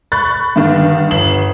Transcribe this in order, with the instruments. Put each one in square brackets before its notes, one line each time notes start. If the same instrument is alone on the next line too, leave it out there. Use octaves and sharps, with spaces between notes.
[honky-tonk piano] B5 C#6 F#6 A6
G2 D3 D#3
G1 E7 F#7